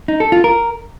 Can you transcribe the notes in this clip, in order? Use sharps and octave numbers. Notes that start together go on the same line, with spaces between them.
D#4
A4
F4
A#4